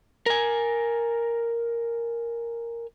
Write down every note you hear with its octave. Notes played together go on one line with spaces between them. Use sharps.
A#4 G#5